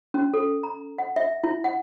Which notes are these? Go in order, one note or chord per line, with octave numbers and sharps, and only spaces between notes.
C#4
A4
A#5
F#5
E5
E4
F#5